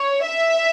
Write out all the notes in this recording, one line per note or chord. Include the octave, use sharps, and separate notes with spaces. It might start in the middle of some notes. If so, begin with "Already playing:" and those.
Already playing: C#5
E5